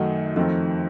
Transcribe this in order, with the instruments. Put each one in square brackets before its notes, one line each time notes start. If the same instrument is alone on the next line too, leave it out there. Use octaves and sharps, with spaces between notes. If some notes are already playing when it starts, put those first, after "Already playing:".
Already playing: [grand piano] F#2 D#3 A3 D#4 F#4
F2 D#3 A3 C4